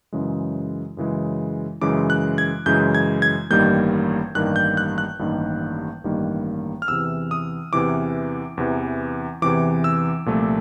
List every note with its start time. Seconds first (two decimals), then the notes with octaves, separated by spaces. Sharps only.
0.12 F#2 C#3 E3 G#3
0.97 F#2 C#3 E3 G#3
1.81 F#2 C#3 E3 G#3 D6
2.10 F#6
2.38 G#6
2.66 F#2 C#3 E3 G#3 G6
2.95 G#6
3.22 G#6
3.50 A1 G2 D#3 G3 A#3 G6
4.35 A1 G2 D#3 G3 A#3 F#6
4.56 G6
4.77 F#6
4.98 F#6
5.19 A1 G2 D#3 G3 A#3
6.04 A1 G2 D#3 G3 A#3
6.82 F6
6.88 E2 C3 E3 E6
7.31 D#6
7.73 E2 C3 E3 D6
8.57 E2 C3 E3
9.42 E2 C3 E3 D6
9.84 E6
10.26 C2 A#2 F3 A3